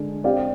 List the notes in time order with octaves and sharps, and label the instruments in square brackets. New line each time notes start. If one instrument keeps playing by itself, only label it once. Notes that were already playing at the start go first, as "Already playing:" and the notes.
Already playing: [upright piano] D3 G#3 D4
C4 G4 D5 F5